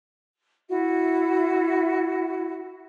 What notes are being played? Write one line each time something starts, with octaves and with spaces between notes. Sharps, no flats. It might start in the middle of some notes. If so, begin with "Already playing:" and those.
E4 F#4 E5